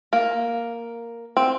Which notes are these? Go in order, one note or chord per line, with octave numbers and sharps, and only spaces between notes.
A#3
C4